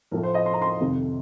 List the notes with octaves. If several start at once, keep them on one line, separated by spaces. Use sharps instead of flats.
A2 F3 A3 A#4
C5
D#5
C6
A#5
C6
F2 C3 D#3 A3